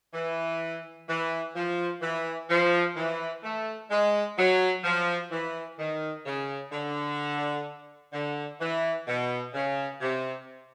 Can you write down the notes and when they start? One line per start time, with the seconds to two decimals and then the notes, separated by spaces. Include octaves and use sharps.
0.14 E3
1.09 E3
1.55 F3
2.02 E3
2.49 F3
2.96 E3
3.43 A3
3.90 G#3
4.38 F#3
4.84 F3
5.31 E3
5.79 D#3
6.25 C#3
6.72 D3
8.13 D3
8.61 E3
9.08 B2
9.54 C#3
10.01 C3